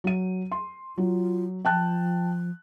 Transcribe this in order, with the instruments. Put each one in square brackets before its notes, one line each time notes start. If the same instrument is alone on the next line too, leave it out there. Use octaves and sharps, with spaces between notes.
[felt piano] F#3 D#7
C6
[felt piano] F#3 [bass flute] F4
[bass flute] F3 [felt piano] G5 A5 F#6